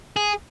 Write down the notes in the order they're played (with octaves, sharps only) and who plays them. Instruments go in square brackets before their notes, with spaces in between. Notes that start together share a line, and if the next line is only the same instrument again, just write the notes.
[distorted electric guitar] G#4